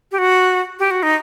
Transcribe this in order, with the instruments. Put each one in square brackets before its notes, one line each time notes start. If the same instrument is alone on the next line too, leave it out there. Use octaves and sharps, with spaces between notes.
[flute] G4
F#4
G4
F#4
D#4